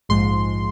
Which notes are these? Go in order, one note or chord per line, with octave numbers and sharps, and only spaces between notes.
A#1 G#2 F3 G#3 C6